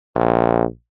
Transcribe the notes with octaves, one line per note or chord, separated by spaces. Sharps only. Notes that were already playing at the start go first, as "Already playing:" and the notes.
A#1